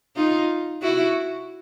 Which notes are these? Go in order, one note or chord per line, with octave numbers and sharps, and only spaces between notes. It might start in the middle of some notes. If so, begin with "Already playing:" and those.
D#4 F4
E4 F#4